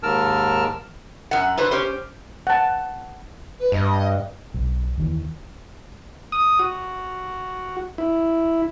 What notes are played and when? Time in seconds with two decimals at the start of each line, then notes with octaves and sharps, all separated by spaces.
0.03 D#2 G#2 A#4 A5 E6 F6
1.31 F#2 F#5
1.58 D3 B4 C5
1.71 C#4 G4 C5
2.47 F#5 A5
3.59 B4
3.72 G2 D#5
4.54 B1
4.98 D#2 D#3 E3
6.32 D#6
6.59 F#4
7.98 E4